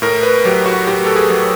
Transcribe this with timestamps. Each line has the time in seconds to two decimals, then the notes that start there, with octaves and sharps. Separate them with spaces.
0.02 A2 A#4
0.23 B4
0.45 F#3 G4
0.66 F#4
0.87 A2 G4
1.06 A4
1.16 G#4
1.30 F#3